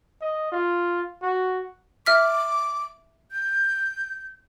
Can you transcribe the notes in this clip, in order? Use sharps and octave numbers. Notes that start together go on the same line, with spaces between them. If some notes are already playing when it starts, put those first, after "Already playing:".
D#5
F4
F#4
E5 D6 F6 B6
G6